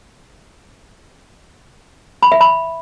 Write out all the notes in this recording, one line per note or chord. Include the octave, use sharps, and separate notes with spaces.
B5
E5
B5